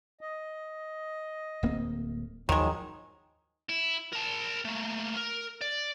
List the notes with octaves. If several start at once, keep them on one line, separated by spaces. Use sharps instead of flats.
D#5
D1 A#3 C4
D#2 G#2 D#3 F3 F#3 G#3
E4
A#4 A5
A3 A#3
A#4
D5